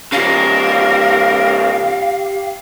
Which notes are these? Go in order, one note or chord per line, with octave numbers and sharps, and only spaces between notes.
C#3 F3 G4 A#4 F5